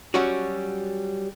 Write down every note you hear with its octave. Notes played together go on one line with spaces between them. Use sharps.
F#3 G3 C#4 F#4